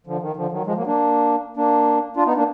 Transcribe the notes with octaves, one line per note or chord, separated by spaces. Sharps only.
D3 F3
D#3
D3 F3
D#3 F#3
F3 G#3
F#3 A#3
A#3 D4
A#3 D4
D4 F4
B3 D#4
A#3 D4